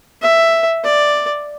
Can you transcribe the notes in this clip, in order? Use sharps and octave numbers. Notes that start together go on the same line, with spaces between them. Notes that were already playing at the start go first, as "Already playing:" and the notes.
E5
D5